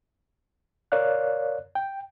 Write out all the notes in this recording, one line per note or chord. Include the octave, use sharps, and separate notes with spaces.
A#4 C#5 D5 F5 F#6
G5